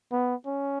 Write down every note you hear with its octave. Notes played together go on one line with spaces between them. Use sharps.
B3
C#4